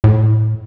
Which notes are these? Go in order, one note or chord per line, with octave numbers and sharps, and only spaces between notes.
A2